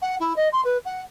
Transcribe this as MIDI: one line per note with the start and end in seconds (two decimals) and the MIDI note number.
0.02 0.15 78
0.20 0.33 64
0.36 0.48 75
0.52 0.61 84
0.64 0.77 71
0.85 1.01 78